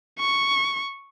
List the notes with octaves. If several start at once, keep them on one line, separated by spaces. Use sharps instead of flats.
C#6